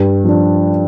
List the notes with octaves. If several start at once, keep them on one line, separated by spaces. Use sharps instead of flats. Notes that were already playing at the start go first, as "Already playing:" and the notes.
Already playing: G2
F3 D4